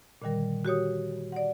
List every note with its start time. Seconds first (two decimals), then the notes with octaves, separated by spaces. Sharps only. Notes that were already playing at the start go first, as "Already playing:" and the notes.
0.22 A#2 D3 D#3 G3 A#4
0.65 F#4 G4 C#5 D#6
1.32 D5 F#5